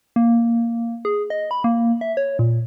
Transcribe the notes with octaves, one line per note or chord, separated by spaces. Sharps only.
A#3
G#4
D#5
B5
A#3
E5
C#5
A#2